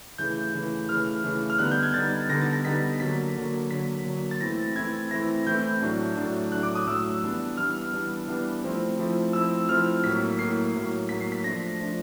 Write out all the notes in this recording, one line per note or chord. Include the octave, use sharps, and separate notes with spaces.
C#3 E3 A3 G6
C#3 E3 A3
C#3 E3 A3 F6
C#3 E3 A3
F6
D3 G3 B3 D#4 F#6
G6
G#6
D3 G3 B3 D#4 A6
D3 G3 B3 D#4 A#6
A6
A#6
D3 G3 B3 D#4 B6
D3 F#3 A#3 B6
D3 F#3 A#3
D3 F#3 A#3 B6
D3 F#3 A#3
A6
E3 A3 C4 E4 A#6
E3 A3 C4 E4 G#6
E3 A3 C4 E4 A#6
E3 A3 C4 E4 G6
A2 F#3 A3 D4
A2 F#3 A3 D4
A2 F#3 A3 D4 F#6
D6
D#6
A2 F#3 A3 D4 E6
E3 G3 B3 D4
E3 G3 B3 D4 F6
E3 G3 B3 D4
E3 G3 B3 D4
F3 A3 C4 E4
F3 A3 C4 E4
F3 A3 C4 E4 E6
F3 A3 C4 E4 F6
A2 F#3 A#3 B6
A2 F#3 A#3 C7
A2 F#3 A#3
A2 F#3 A#3 B6
C7
B6
F3 A3 D4 A#6
F3 A3 D4